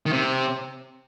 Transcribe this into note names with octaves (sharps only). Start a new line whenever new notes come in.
D#3
C3